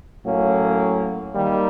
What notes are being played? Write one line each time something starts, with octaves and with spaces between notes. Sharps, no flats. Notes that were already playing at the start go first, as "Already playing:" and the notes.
A2 F#3 A#3 C#4
D#3 G3 A#3